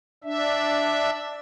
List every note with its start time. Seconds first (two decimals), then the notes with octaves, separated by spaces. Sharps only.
0.24 D4 E5